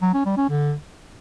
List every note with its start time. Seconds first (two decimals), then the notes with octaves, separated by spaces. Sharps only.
0.02 F#3
0.14 C#4
0.25 G3
0.37 C#4
0.49 D3